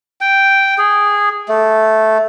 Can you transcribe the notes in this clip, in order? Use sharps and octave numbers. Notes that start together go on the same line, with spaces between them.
G5
G#4
A3